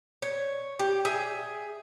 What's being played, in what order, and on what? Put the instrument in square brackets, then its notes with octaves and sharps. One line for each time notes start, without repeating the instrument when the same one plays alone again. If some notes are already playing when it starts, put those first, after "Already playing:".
[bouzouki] C#5
G4
G#4 E5